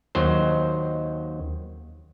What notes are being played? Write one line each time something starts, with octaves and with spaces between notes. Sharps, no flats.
D#2 D#3 F#3 C5